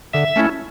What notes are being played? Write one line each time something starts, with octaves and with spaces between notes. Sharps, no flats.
D3 E5
A3 C#4 E4